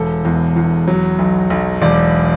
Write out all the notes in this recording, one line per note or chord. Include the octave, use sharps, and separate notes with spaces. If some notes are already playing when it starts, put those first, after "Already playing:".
Already playing: E1 A4
E2
E2
F#3
B1
B1
E1 D5